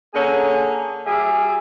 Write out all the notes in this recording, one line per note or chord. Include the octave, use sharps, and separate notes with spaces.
D3 A#3 C#4 G#4
G3 F#4 G#4 E5 G#5